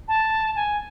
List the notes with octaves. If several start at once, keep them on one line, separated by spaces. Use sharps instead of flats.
A5
G#5